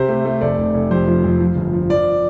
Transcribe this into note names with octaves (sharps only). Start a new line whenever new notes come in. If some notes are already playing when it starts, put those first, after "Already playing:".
Already playing: C3 G4 C5
A3
A3
F1 A4 D5
F1
F1
F2 G4 C5
F3
F2
F3
G1
F3
F3 D5